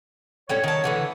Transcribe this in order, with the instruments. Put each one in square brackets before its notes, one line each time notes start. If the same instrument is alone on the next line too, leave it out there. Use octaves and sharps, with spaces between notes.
[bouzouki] A2 G3 C#4 [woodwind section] C#5
[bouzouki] D#3 A5
D3 E3 A3